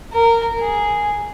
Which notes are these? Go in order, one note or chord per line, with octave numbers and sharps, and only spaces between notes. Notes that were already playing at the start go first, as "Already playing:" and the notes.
A#4
G#4